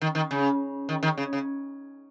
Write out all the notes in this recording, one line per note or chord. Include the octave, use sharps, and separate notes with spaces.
D#3
D#3
C#3
D#3
D#3
C#3
C#3